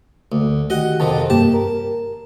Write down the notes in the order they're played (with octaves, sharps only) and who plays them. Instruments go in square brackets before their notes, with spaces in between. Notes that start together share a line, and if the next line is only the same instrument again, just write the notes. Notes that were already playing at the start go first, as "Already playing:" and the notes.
[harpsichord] D2
[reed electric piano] D#3 F#4 G4 [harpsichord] D#5 F#5
[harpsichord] F2 C3 D#3 [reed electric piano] A5
[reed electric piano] G2 A#3 G4 [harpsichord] A5
[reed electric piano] A#4